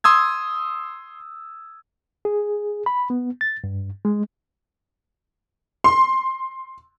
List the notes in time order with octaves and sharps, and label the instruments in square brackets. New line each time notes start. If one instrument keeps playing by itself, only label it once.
[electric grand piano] C6 D#6 E6 G#6
[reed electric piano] G#4
B5
B3
A6
G2
G#3
[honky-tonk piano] C6